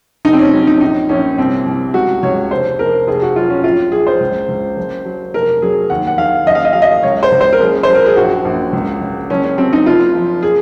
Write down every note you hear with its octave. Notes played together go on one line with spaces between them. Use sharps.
F1 D#4
C4
C#4
F#3 C#4
D#4
A#1 D#4
A#1 C#4
C2 C4
C2
C#2 F#4
C#2 C#5
F1 C5
F1 A#4
F1 G#4
F#4
F#3 F4
C#4
A#1 F4
A#1 G#4
C5
C#2
C#2
F#1
F#3
F1 A#4
F#3 G#4
D#2 F#5
F#5
D#2 F5
F#1 D#5
F5
D#5
F#3 F5
D#5
C#2 C#5
C5
C#2
C5
A#4
F#1 G#4
C5
F#3
A#4
G#4
A#1 F#4
A#1
C#2
C#2
F#1 C#4
C#4
F#3 C4
D#4
F#1 F4
F3
G#4